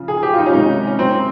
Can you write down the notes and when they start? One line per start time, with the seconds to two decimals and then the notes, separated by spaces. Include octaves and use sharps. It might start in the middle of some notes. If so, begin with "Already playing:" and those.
Already playing: C#3 F3
0.08 G#4
0.23 G4
0.33 F4
0.38 D#4
0.46 C#4
0.53 C3 D#3 G#3 D#4
0.87 C#4
0.99 C4